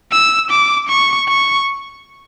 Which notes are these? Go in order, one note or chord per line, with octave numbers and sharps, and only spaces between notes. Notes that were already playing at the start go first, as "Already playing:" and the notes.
E6
D6
C#6
C#6